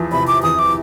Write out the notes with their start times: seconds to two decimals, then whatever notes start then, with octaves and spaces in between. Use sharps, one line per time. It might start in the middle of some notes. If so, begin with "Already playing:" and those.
Already playing: E2 F3
0.12 C3 B5
0.27 D6
0.43 E2 D#6
0.59 D6